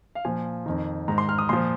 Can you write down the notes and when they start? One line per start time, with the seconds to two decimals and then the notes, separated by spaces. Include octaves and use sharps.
0.15 F5
0.25 A#2 F3 G#5
0.66 F2 D#3
1.08 G#2 D#3 A#5
1.18 C6
1.29 F6
1.38 D#6
1.49 A#2 F3 C6